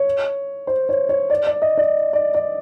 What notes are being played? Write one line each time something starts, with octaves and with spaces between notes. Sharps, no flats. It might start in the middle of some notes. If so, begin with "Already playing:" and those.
Already playing: C#5
C5
C#5
C#5
D5
D5
D#5
D5
D5
D5